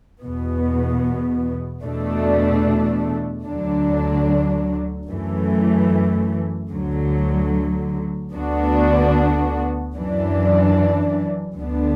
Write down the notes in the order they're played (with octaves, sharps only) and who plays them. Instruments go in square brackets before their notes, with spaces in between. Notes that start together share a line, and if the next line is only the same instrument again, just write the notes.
[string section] E2 B2 B3
E2 B2 A3 D4
D2 D3 F#3 D4
F#2 E3 A3
D2 D3 F#3
D2 D3 B3 D4 F#4
F#2 E3 D4
D2 D3 B3 D4